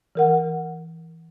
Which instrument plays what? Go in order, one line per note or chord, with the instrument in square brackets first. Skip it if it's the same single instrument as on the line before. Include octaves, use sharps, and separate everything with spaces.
[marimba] E3 A#4 F#5